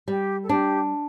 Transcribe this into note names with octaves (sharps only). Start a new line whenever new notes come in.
G3 G4
A4
D4 G4